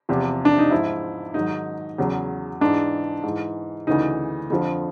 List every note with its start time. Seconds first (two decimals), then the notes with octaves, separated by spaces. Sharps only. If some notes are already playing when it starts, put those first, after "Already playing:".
0.09 E2 C3 F3
0.45 D4
0.58 D#4
0.71 G#2 F3 E4
1.34 G#2 D#3 F#3 D#4
1.98 E2 C#3 F#3
2.61 G#2 E3 D4
3.23 G#2 E3
3.87 D2 C#3 E3 D#4
4.50 F2 D3 F3